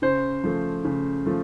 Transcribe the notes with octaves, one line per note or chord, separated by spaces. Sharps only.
C#3 C5
F3 A3
C#3
F3 A3